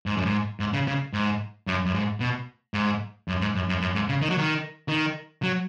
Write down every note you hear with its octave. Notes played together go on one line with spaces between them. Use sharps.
G#2
F#2
G#2
G#2
C#3
C#3
G#2
F#2
F#2
G#2
B2
G#2
F#2
G#2
F#2
F#2
F#2
G#2
C#3
D#3
F#3
D#3
D#3
F#3